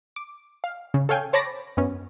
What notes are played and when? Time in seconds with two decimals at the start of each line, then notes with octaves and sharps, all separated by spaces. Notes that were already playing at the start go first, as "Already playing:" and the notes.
0.16 D6
0.64 F5
0.94 C#3
1.09 A4 C#5 F5 G5 G#5
1.33 C5 C#5 A5 B5 D6 A#6
1.77 F#2 B3 C#4